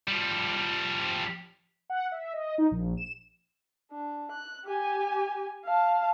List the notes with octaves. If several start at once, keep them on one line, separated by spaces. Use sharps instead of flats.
F3 G3
F#5
E5
D#5
D#4
A#1
E7
D4
F#6
G4 G#5
F5 A5